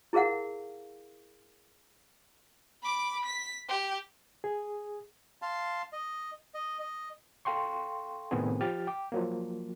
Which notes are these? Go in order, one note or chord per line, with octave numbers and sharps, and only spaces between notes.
E4 G#4 A#4 F5 F#5
B5 D6
B6
G4
G#4
F5 A5 C6
D#5
D#5
D#5
A4 F5 G5 C6 C#6
A2 C3 D#3 B3 C4 G#4
F3 G4 F6 A6
G5 D6
F3 F#3 A#3